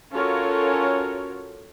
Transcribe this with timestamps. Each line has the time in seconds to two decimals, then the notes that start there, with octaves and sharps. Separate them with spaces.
0.14 C#4 F4 F#4 A4 A#4 C#5